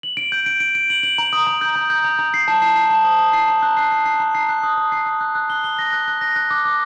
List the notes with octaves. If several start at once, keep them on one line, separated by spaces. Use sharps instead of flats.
F#7
D7
G6
D7
D7
D7
F#7
F#7
A#5
D#6
A#5
G6
A#5
G6
A#5
A#5
C7
A5
C7
C7
A5
D#6
D#6
C7
A#5
F#6
C7
C7
C7
A#5
C7
F#6
D#6
D#6
C7
D#6
F#6
F#6
G7
G7
A#6
F#6
F#6
A#6
F#6
D6
D6